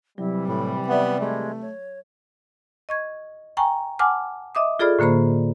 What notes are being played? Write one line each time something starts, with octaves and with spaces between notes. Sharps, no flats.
C3 E3 F#3 G3 E4
A2 B5
B3 D5 E5 F#5
G#3 A3
C#5
D#5 C#6 G#6
G5 G#5 A#5 C#6
F#5 G#5 A5 D6 F6
D#5 E5 D6 D#6
F4 G#4 A4 D5 B5 F6
A2 D3 A#3 C5 B5